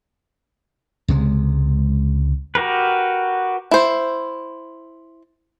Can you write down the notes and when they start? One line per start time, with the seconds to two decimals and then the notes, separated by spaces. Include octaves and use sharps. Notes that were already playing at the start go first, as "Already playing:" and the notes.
1.08 C#2 C3 G#3
2.55 F#4 G4 A#4 B4
3.71 E4 C5